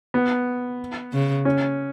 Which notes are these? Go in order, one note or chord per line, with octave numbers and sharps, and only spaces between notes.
B3
C#3
C#4